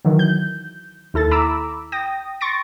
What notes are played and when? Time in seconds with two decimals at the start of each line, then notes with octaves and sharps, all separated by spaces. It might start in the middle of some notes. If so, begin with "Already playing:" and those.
0.05 D#3 E3 F#3
0.19 G6
1.14 D#2 E4 A4 A6
1.31 A#5 B5 D6 E6
1.92 G5 D#6 A#6
2.41 C6 C#6 A6 A#6 D7